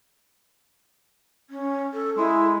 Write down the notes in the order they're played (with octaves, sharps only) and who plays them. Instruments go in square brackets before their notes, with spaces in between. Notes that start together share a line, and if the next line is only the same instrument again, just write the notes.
[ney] C#4
A4
[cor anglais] G#3 [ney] E4